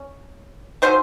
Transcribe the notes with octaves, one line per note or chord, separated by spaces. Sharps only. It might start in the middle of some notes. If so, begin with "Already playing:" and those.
Already playing: C#4
D#3 F#3 C#4 F4 C5